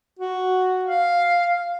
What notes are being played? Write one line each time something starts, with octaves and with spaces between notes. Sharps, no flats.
F#4
F5